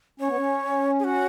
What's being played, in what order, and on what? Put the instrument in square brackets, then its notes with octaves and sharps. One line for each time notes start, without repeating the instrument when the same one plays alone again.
[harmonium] C#4 [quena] C#5
[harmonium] B3
C#4
[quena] G#4
F#4